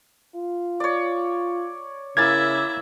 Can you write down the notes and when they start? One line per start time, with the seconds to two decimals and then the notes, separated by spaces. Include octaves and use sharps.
0.35 F4
0.80 C#5 D5
2.17 C#3 A#3 E4 E5 G#5 G#6 A6